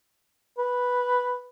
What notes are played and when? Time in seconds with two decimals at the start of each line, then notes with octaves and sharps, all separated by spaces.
0.58 B4